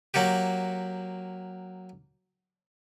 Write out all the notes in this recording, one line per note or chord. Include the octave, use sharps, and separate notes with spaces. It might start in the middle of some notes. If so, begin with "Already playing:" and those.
F#3 A#3 F#4 G4